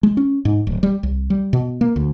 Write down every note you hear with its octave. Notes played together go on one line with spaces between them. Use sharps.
G#3
C#4
G#2
D1
G3
C2
G3
B2
A#3
D2